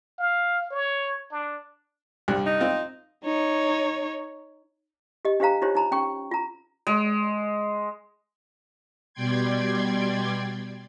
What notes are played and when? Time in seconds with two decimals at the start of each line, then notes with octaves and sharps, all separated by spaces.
0.19 F5
0.71 C#5
1.31 D4
2.28 C2 G2
2.46 D#4
2.60 C4 F4
3.24 D#4 C#5
5.25 G4 D#5
5.40 D4 G4 C5 F5 A#5
5.62 D#4 F4 G4 C5 C#5
5.75 D#4 A#5 B5
5.91 C#4 G5 C#6
6.31 F4 A#5
6.87 G#3
9.14 B2 G3 D5 G5 C6 G#6